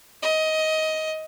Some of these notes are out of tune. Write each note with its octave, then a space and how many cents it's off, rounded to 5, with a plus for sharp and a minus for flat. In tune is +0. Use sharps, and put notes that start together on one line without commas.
D#5 +15